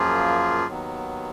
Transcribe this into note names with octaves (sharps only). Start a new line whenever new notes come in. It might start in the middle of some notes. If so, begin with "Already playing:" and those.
Already playing: F#2 F3 A#3 F4 G#4
D#2 D#3 F#3 B3